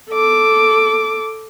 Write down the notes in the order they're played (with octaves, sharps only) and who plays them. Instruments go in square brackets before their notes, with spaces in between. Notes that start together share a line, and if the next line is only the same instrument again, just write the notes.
[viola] A4 D6